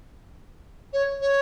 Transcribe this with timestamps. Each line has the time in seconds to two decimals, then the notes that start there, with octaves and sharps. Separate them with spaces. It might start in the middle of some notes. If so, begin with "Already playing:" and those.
0.93 C#5
1.21 C#5